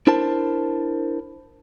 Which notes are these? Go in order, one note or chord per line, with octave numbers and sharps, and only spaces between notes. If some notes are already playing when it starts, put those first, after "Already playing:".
D4 E4 A#4 C5 A5